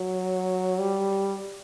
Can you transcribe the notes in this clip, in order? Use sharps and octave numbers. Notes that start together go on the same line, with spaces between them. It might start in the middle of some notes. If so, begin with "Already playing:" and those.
Already playing: F#3
G3